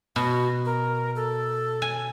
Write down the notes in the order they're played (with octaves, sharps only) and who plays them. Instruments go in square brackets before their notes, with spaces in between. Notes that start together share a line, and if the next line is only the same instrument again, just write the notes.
[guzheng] B2 [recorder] F#4
[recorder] A#4
A4
[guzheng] G#5